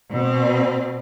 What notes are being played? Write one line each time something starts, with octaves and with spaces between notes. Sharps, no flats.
B2 C4